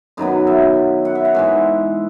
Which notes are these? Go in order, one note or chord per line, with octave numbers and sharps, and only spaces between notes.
F#2 D#3 F#3 B3 D#5
E5
F#5
E5
F#5
G#2 E3 G#3 E5